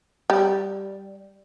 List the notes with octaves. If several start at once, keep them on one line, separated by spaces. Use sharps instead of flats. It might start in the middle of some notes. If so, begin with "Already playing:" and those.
G3